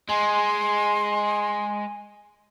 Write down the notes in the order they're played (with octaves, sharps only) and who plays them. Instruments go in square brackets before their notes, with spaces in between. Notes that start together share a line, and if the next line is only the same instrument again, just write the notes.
[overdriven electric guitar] G#3 [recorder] G#5 [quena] C6